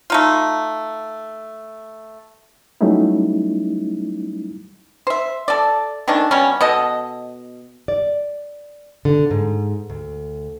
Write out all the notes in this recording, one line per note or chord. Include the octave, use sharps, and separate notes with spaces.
A3 D#4 F4
F#3 G3 A3 C#4 D#4 E4
C5 E5
A4 D5
D#3 A3 C#4 D4
B2 G3 C#4
B2 A4 D#5
D5
D3
G#2
D2